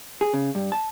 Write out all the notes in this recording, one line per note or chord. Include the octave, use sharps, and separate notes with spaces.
G#4
C#3
G2
A5